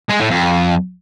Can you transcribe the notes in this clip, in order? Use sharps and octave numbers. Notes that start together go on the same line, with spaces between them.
G#3
A2
F2